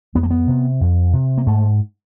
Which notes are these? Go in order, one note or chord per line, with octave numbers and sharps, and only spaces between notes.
F2 B3
A#3
B3
C3
F2
C3
A#3
G#2 A3